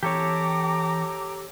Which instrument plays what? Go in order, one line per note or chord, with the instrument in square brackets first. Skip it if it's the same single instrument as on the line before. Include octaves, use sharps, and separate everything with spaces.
[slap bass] E3 C4 [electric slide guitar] G4 A4 C#5 [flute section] G5 A#5 D6